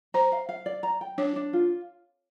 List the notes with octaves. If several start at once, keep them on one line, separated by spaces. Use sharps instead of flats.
C5 A#5
F5
F5
D5
A#5
G5
D4 C#5
D4
F4